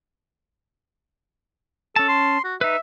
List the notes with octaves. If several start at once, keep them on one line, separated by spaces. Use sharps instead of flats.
C#4 A4 A5
C6
F#4
D#4 B4 E5